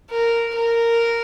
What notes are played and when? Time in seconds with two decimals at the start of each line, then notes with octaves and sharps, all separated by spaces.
0.10 A#4
0.55 A#4